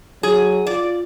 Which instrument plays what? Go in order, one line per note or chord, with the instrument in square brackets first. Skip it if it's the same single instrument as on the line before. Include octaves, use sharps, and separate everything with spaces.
[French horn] F#3 [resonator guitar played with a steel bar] G#4
[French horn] F4 [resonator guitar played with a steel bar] D5